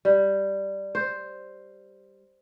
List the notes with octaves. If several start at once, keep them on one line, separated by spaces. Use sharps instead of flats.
G3
C5